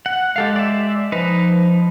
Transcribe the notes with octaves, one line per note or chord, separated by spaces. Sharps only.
F#5
G#3 G4 A4 F5
D5 E5
F3 D#4 B4